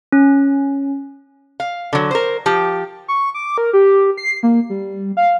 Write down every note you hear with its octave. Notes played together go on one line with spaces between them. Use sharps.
C#4
F5
D3 F#3
A#4 C5
F3 G4
C#6
D6
A#4
G4
C7
A#3
G3
F5